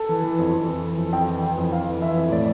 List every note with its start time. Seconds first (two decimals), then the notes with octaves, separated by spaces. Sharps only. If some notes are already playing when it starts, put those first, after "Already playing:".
Already playing: A4
0.09 E3
0.24 E3
0.39 F2
0.53 F2
0.68 E3
0.83 E3
0.98 F2
1.13 F2 G5
1.28 E3
1.43 E3 G5
1.58 F2
1.72 F2 F5
1.87 E3
2.02 E3 E5
2.17 F2
2.32 A2 D5